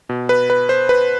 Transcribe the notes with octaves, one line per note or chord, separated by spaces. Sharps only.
B2
B4
B4
C5
B4